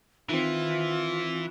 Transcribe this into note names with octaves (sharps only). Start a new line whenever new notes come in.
D#3 E3 C4 F4